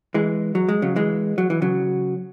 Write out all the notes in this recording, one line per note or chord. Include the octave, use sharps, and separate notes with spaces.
E3 G#3
F#3
G#3
C#3 F#3
E3 G#3
F#3
E3
C#3 F#3